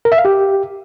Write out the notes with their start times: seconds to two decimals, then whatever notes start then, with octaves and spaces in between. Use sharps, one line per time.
0.05 A#4
0.12 E5
0.18 F5
0.25 G4